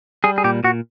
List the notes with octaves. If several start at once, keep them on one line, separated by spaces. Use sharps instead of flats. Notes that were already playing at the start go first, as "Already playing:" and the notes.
G3 G#4
G#4
A#2 G4
A#2 F#4